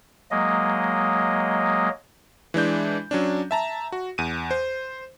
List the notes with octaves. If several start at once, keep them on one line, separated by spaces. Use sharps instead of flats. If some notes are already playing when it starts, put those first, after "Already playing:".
F#3 G#3 A#3 D#5
E3 G#3 D4 G6
F#3 C#4 D4
E5 A5 A#5
F#4
E2 D#7
C5